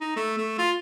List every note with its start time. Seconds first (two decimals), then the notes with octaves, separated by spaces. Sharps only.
0.01 D#4
0.16 A3
0.38 A3
0.58 F4